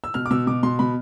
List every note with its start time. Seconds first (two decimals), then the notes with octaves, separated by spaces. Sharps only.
0.04 E6
0.14 B2 F6
0.26 D6
0.31 B2 E6
0.47 B2 D6
0.63 B2 C6
0.79 B2 B5